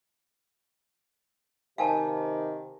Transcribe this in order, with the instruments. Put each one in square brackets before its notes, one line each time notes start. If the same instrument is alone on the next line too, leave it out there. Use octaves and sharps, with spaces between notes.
[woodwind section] C3 D#3 [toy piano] F5 G#5 A5